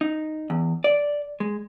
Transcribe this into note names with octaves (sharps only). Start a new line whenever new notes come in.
D#4
E2
D5
G#3